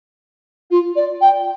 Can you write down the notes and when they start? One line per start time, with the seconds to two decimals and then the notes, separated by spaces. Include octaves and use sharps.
0.71 F4
0.96 D5
1.21 G5